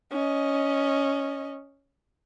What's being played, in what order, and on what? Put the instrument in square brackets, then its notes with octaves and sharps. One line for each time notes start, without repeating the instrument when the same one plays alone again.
[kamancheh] C#4 D#5